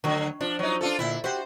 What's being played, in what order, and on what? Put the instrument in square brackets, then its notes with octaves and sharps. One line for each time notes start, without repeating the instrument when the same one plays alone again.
[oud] D2 F#3 [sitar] D3
[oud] F3 [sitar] D4
[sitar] F#3 D#4
D4 F4 A4
[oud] A#2 D3 E5 [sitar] E4
[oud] F#4 G4 [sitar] C5